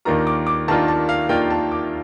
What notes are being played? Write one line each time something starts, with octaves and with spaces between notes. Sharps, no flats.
D#2 D#3 A#3 D4 F4 A#5
D6
D6
D#2 D#3 A#3 D4 F4 A5
A5
F5
D#2 D#3 A#3 D4 F4 G5
A5
D6